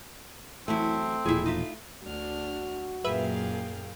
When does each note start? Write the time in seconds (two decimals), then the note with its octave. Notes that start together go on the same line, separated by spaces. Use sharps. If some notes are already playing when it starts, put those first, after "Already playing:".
0.68 E2 F#3 A3 C4 E4
1.26 E1 A#2 F3 E4 G#4
1.46 D#4 F4 E5
2.03 D2 D4 F#4 F6
3.04 F#2 A#2 G#4 A#4 B4 E5 F5 G5